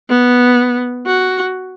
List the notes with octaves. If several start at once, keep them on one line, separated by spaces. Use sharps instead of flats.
B3
F#4